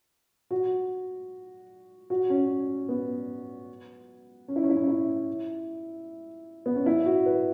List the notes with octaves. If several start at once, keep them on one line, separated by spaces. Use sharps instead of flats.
F#4
F#4
C#4
B3
C#4
E4
C#4
E4
C#4
E4
B3
C#4
E4
F#4
B4